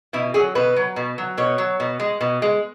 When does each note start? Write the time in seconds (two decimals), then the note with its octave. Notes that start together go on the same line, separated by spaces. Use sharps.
0.13 B2 E4
0.34 F#3 G#4
0.55 B2 B4
0.76 F#3
0.96 B2
1.18 F#3
1.38 B2 C#5
1.58 F#3
1.80 B2
2.00 G#3
2.21 B2
2.42 G#3